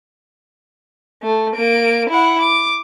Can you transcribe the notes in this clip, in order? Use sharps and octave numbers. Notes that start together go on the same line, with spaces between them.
A3
A#3 D7
E4 F#5
D6